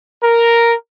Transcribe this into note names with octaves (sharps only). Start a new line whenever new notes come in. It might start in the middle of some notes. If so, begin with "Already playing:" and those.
A#4